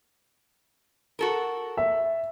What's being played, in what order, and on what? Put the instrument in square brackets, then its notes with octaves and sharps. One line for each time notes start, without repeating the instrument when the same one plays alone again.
[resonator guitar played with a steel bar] F#4 A4 A#4
[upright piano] E5